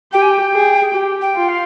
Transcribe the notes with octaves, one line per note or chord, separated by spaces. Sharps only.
G4 G5
G#5
G5
G#4
G4
G5
F4
F5